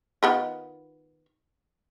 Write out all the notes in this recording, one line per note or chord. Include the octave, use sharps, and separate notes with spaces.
D#3 B3 F4